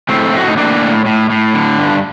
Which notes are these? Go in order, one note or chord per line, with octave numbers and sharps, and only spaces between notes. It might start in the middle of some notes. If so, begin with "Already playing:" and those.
A2 A3 C4
A2 F#4
D#4
A2 A#3 D4
A2
A2
A2
D3
G2